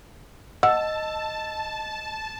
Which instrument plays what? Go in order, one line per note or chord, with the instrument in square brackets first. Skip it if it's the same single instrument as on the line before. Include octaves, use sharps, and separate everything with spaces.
[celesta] D#5 [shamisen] F#5 [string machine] A5 [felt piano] E6